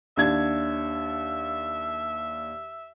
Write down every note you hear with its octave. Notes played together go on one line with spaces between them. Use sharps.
D#2 D4 E5 G#6